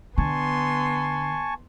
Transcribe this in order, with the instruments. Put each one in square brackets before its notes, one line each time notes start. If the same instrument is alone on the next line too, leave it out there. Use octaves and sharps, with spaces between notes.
[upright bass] D3 [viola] B3 C6 [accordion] G#5 A5 C#6